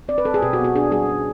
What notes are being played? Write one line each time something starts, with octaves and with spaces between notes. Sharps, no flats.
C4 D5
B4
C4 A4
G#4
B2 G4
F#4
B3
F#4
D4 G#4
G3 G#4
C#4